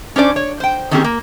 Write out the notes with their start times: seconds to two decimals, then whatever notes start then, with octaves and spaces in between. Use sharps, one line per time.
0.16 C#4 D4 C5 D5
0.36 C#5
0.60 C5 G5
0.91 D#3 A#3 C4 C#4 G4 G#4
1.04 A#3